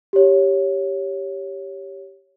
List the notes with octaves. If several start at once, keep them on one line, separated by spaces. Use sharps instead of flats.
G4 C#5